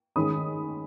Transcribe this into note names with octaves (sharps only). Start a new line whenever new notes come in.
D#3 G#3 C#4 B5 D#6